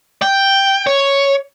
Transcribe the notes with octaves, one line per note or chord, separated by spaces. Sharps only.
G5
C#5